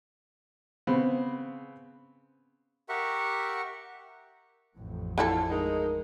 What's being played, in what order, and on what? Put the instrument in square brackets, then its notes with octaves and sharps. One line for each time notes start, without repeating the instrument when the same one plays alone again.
[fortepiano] C#3 B3 C4
[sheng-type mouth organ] G4 A#4 E5 F#5 C#6
[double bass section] A1 F2 A2
[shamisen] D3 E4 A4 [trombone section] F3 [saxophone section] F4
[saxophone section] G#3 D#4 [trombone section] A#4